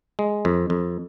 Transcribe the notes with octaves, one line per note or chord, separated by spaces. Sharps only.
G#3
F2
F2